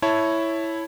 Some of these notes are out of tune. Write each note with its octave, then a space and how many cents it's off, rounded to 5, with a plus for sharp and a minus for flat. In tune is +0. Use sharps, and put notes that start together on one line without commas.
E4 +0 C#5 +0 A5 +0